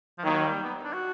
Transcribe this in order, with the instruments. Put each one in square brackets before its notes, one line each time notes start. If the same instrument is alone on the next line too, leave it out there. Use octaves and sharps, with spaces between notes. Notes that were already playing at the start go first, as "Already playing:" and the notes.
[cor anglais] F3
[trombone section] D#2 D#3 [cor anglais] F#3
[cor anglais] G3
B3
D4
F#4